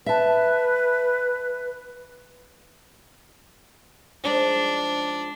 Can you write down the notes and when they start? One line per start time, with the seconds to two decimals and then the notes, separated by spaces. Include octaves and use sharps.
0.06 B4 E5 A5
4.24 F3 G#3 D4 D#4